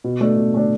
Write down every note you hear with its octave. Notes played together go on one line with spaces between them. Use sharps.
B2
A3 D4
B2
A3 D4